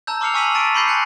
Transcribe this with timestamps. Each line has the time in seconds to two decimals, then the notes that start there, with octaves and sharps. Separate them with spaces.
0.07 A5 A#5 E6 G6
0.21 C6 D6 F6 C7 C#7 F7
0.34 G#5 C#6 E6 B6 D#7 F#7
0.55 A5 C#6 A6 D7 D#7
0.75 B5 C6 D6 G6 A#6 C7
0.87 G#5 F#6 G6 C#7